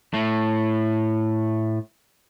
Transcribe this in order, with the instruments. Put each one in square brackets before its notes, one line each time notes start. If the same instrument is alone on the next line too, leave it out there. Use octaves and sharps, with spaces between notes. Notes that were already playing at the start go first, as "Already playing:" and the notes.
[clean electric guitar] A2 A3